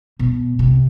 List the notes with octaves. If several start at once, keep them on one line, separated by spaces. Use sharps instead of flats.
B2
C3